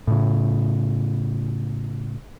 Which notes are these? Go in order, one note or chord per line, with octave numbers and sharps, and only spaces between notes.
A2 C#3